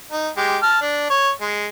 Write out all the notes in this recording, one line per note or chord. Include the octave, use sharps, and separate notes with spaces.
D#4
G#3 G4
A5 F6
D4
C#5
G#3